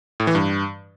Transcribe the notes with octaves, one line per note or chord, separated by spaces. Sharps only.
A2
E3
G2